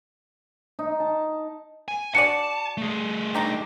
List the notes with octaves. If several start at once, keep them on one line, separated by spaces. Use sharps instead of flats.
D#4
A5
G#5
D4 F#4 D5 A5 C#7
A3 G#4
D4 D#4 G4